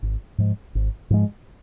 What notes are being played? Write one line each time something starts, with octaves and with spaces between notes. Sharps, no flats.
G#1
G#2 F3 G#3
G#1
G#2 F3 G#3